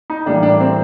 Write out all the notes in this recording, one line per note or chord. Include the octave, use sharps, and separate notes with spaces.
D#4
A2 E3 G3 A#3 D4
D4
C4